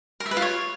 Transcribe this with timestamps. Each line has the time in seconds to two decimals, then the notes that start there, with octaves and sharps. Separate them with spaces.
0.20 A#4
0.26 E5
0.31 B4
0.37 F4
0.42 C#5